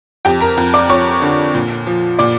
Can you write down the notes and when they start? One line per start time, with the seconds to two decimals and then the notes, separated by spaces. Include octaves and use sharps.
0.25 F2 G4 G5
0.41 A#4 A#5
0.57 F2
0.74 D5 D6
0.89 F2 C#5 C#6
1.22 D3
1.55 A#2
1.87 F3
2.19 A#2 D5 D6